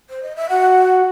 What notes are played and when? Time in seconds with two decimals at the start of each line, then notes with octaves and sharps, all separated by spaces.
0.10 C5
0.23 D#5
0.36 E5
0.49 F#4 F#5